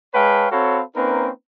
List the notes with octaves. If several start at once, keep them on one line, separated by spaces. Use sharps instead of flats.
G#3 B4 C#5 F5 G5 A5
C4 F#4 A4 C#5 F5 B5
A#3 C4 C#4 D#4 A#4 B4